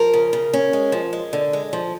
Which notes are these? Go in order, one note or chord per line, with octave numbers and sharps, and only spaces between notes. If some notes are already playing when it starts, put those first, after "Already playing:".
Already playing: F3 A#4
C#3
C#3
C#4
G#3
F3
G#3
D3
G#3
F3